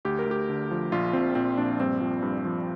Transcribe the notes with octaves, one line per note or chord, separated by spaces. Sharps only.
D2 G4
A#4
D2
G4
D3
F3
A#1 F4
A#1 C4
A#2 C4
A#1 D4
G2 C4
F3
G2
F3